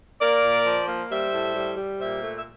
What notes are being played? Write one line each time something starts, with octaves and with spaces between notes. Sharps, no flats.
A#3 A#4 D5
A#2
F3
A#3
G3 C5 E5
A2
G3
G3
A#2 C5 E5
A3
E5